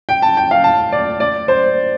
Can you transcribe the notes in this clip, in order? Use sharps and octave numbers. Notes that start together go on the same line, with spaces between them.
G5
A5
G5
F5
A5
D5
D5
C5